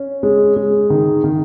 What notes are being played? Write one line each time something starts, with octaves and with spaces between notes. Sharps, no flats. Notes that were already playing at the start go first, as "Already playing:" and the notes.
Already playing: C#4
G#3
G#3
D#3
D#3